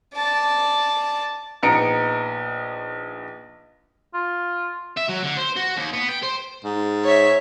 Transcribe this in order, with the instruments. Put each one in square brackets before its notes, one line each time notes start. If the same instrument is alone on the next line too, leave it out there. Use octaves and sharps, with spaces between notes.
[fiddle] D5 A5
[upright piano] A#1 B3 D#4 A#5 C#7 D7
[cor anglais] F4
[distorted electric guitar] E5
F#3
D3
C5
F#4
D#2
B3
G5
C5
[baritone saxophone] G#2
[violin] C#5 E5